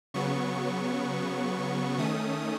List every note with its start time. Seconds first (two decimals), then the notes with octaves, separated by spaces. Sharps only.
0.14 C#3 F#3 B3 C#6
1.98 D#3 A3 C#4 D#6